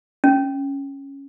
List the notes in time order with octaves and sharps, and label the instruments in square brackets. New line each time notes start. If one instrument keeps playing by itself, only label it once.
[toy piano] C#4